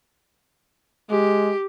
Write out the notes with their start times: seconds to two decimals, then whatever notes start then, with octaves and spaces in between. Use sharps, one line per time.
1.10 G#3 G4